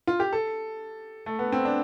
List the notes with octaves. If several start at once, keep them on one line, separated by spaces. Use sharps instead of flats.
F4
G4
A4
A3
B3
C4
D4